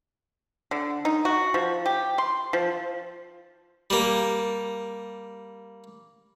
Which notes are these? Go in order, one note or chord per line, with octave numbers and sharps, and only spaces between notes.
D3
D#4
F#4
F3
G4
C6
F3
G3 A#3